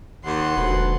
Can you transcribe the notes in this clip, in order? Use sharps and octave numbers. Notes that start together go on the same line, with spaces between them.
D#2 F#5 C6
E1 D2 B4